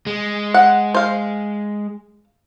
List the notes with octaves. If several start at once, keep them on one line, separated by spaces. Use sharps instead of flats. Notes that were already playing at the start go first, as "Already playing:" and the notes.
G#3
F#5
C5 F5